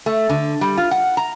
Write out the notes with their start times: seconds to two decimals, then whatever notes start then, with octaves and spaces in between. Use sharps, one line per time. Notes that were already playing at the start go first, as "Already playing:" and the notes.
0.06 A3
0.29 D3
0.61 G3
0.77 F4
0.91 F#5
1.17 A#5